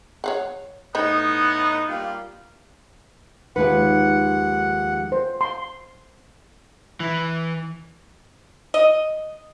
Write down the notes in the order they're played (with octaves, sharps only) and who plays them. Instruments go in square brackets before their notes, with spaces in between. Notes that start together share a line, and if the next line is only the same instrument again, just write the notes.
[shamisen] C#5 F5 F#5
[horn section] A2 D#4 [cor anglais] B3 [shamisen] C5 D#5 B5
[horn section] G3 A#3 F4
[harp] D#2 [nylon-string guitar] F3 G#3 B4 [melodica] F#5
[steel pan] C5
C6
[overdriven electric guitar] E3
[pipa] D#5